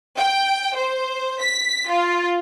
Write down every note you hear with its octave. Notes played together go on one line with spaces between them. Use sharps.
G5
C5
B6
F4